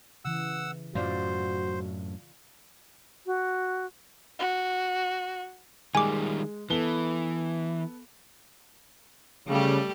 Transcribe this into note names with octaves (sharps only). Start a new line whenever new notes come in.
C#3 E3 F#5 E6
F#2 A2 F#3 F4 F#4 C5 D5 F5
F#4
F#4
D#3 G3 G#3 G#5 D6
E3 B3 A4 G7
C#3 G3 A3 G4